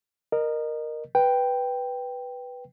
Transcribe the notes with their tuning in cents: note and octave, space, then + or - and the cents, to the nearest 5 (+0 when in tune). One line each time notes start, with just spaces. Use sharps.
A#4 +0 D#5 -25
B4 +0 G5 +0